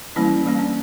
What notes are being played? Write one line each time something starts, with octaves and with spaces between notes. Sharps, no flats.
E3 G3 A#3 C#4 E4
E3 G3 A#3 C#4
D4